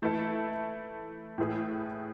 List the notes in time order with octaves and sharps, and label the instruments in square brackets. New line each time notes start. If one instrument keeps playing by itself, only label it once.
[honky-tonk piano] E3 A3 E4 A4
A2 E3 A3 E4 G#4